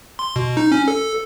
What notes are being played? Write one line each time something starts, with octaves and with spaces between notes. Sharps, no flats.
C6
B2
D#4
C#4
A4